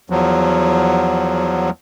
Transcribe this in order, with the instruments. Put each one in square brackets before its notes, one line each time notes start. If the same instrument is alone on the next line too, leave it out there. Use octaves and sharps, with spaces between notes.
[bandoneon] E2 F3 F#3